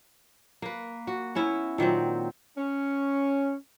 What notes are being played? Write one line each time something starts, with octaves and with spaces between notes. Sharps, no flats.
A#3 B4
F#4
B3 C#4 E4
A#2 D#3 F#3 C4
C#4